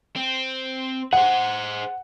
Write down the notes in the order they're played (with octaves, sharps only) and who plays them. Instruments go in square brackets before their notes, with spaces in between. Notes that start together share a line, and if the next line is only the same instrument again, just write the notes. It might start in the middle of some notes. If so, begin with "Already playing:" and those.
[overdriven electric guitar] C4
[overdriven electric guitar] G#4 C5 [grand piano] F#5